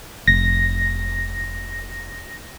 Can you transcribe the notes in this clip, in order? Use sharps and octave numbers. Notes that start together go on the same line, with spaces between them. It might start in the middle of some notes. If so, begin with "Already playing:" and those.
F1 A#6